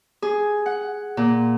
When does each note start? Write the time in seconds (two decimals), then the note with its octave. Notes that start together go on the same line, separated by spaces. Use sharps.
0.22 G#4
0.66 F#5
1.17 A#2